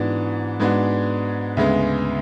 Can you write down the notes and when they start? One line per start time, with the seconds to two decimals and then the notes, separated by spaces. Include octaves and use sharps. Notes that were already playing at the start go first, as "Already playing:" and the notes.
Already playing: G#2 E3 B3 D4 F#4
0.60 G#2 G#3 B3 D4 F#4
1.57 D2 C#3 G#3 B3